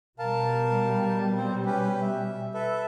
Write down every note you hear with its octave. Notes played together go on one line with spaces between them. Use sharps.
B2 G3 A#4 F5 A5
C4 C5
C#4 G4 B4
E5
A4 B4 E5